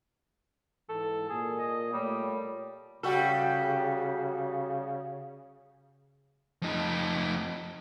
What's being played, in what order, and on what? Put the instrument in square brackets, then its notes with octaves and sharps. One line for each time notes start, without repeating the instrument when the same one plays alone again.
[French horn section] G#2 E3 [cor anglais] A4
[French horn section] A#2 A#3 [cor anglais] G#4
[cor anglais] D#5
[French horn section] A#2 A3 C#5 [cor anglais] G3
[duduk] C#3 [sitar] G3 F#4 A4
[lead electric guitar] F2 D#4